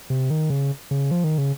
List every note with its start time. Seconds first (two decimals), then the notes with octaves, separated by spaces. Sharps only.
0.10 C3
0.30 D#3
0.50 C#3
0.91 C#3
1.11 F3
1.24 D#3
1.38 C#3